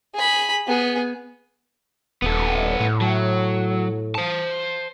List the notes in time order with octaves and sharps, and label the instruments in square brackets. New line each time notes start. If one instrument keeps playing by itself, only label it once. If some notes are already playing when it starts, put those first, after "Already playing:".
[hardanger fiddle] G#4 B5
B3 G#4
[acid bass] D#1 [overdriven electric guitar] B3 A4
[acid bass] A2
[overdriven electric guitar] F#3
C5 A5